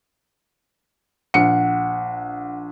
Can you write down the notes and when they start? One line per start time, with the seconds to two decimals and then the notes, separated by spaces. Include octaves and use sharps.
1.34 A#1 F#5 C#7